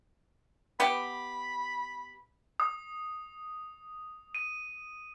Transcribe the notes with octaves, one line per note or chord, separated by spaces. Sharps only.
B3 G4 B5
D#6
D#7